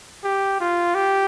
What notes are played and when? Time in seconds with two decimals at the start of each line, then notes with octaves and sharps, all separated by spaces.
0.24 G4
0.60 F4
0.95 G4